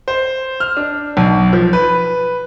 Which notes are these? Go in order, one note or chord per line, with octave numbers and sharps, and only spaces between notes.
C5
F6
D4
B1
F3
B4